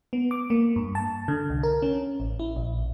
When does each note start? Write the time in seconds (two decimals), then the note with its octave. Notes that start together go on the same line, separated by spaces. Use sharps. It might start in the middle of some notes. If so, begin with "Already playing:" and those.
0.13 B3
0.31 D6
0.50 A#3
0.76 G2
0.95 A5
1.28 D3
1.50 C2
1.63 A#4
1.82 C#4
2.20 A1
2.39 E4
2.57 A#1